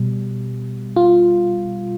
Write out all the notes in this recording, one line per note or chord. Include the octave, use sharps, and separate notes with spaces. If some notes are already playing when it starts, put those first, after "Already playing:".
Already playing: B2 G3
F4